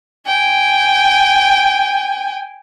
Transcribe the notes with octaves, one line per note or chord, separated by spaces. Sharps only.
G5 G#5